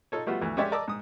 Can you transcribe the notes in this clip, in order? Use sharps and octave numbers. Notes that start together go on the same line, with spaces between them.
D#4 F4 A4 C#5
G3 A3 B3 F4 F#4
D2 E3
G#3 C#4 G4 C#5 D5 E5
A#4 D5 D#5 A5 D6 E6
G#2 D#6